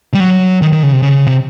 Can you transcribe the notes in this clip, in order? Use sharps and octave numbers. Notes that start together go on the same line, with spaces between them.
G3
F#3
D#3
D#3
C#3
C3
C#3
C3